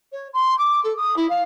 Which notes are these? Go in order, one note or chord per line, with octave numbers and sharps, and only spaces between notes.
C#5
C6
D6
A4
D#6
E4
F5